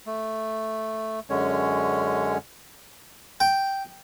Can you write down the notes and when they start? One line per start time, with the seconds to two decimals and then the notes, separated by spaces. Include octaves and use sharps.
0.07 A3
1.30 F#2 D3 G#3 C#4 C#5
3.40 G5